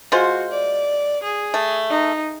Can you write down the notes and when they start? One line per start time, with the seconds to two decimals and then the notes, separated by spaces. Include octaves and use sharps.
0.12 G#3 F4 F#4 C5
0.52 D5
1.24 G#4
1.54 A3
1.90 D#4